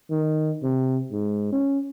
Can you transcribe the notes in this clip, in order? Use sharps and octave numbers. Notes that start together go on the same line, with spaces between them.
D#3
C3
G#2
C#4